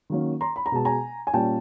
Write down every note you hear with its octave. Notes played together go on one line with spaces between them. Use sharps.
D#3 F#3 A#3 C#4
A#5 C6
B5
A#5
B2 G#3 B3 A5
G#5 A#5
G#5
A#2 G3 A#3 C#4 G5 A5